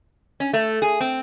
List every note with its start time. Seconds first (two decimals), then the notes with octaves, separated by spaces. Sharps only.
0.40 C#4
0.53 A3
0.82 G#4
1.00 C4